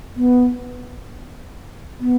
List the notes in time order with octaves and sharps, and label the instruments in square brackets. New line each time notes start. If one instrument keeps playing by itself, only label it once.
[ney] B3
B3